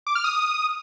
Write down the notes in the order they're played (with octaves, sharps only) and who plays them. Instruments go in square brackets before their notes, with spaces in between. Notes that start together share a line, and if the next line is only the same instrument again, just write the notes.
[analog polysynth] D6
F6
D#6